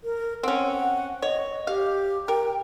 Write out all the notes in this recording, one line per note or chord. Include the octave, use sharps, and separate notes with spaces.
A#4
C4 C#4 F#5
C#5 D#5
G4 F5
A#4 G5